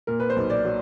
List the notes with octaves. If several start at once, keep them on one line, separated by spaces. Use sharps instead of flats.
A#2 A#4
B4
C5
B1
D5
F#3